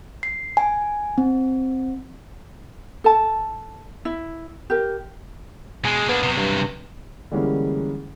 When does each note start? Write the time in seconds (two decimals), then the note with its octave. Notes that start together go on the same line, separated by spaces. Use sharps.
0.23 C7
0.57 G#5
1.18 C4
3.04 A4 A5
4.05 E4
4.70 G4 A#4
5.85 B2 G#3 G#4
6.09 A#3 B3 D4
6.23 C3 F#3
6.37 G2
7.31 D3 E3 G3 G#3 A#3 C#4